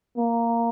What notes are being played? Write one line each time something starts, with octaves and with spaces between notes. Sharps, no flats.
A#3